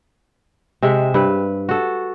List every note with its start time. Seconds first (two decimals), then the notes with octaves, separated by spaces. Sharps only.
0.82 C3 G#3 E5
1.14 G2 B4
1.69 F#4 A4